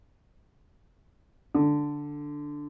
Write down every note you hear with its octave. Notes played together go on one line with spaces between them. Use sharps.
D3